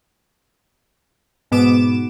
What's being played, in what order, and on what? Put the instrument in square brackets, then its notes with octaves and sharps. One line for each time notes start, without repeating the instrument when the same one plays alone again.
[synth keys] G#2 B2 B3 D6 E7